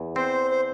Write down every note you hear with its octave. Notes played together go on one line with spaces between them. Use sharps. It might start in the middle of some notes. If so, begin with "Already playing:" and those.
Already playing: E2
C4 C5
C5